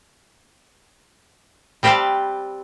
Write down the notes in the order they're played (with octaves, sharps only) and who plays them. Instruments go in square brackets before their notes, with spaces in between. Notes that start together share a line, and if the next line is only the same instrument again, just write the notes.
[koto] G3 C4 G4 B4 F5 A5